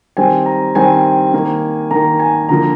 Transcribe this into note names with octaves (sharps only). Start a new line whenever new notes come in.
D#3 G3 C4 G#5
A#5
D#3 G3 C4 G#5
D#3 A#3
D#3 A#3 A#5
G#5
D3 F3 A#3 A#5